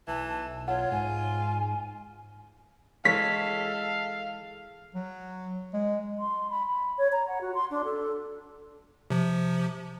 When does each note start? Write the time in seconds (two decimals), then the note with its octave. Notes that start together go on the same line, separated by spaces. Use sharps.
0.08 B1 E3 A5
0.68 F4 C#5 F#5
0.91 G#2 G#5
3.05 E3 G#3 A4 C#5 F5 B6
4.95 F#3
5.74 G#3
6.19 C6
6.50 B5
6.67 B5
6.98 C#5
7.12 A#5
7.27 F#5
7.41 F#4
7.54 C6
7.71 D4
7.85 A4
9.10 C3 F3